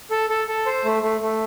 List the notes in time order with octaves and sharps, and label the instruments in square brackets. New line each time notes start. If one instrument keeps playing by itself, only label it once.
[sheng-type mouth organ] A4
A4
A4
C5
A3
A3
A3